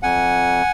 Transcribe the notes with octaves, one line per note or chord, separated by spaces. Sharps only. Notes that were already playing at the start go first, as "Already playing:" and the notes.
F2 F#5 G#5